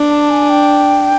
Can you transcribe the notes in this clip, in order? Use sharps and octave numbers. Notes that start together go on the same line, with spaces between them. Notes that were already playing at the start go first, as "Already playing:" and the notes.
Already playing: D4
A5
G#5
G5